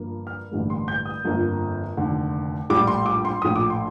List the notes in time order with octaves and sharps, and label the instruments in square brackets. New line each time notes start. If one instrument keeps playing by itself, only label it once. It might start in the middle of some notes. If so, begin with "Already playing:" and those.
Already playing: [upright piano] G1 G2 F3 A#3
F6
A1 G2 D3 G3 A#3
C6
G6
D#6
G1 F2 D3 F3 A#3
F1 D#2 D3
A#1 A2 G3 D6
C6
D6
C6
A#1 A2 F3 D#6
D6
C6